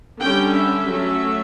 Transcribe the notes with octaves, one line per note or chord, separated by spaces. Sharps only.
D3 G3 C#4 G5
E5
F#3 A3 C#4